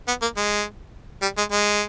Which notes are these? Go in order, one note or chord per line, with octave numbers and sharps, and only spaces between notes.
B3
A#3
G#3
G3
G#3
G#3